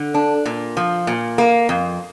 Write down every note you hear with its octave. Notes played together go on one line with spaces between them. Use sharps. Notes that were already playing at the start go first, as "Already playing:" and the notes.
Already playing: D3
D4
A#2
F3
A#2
A#3
F2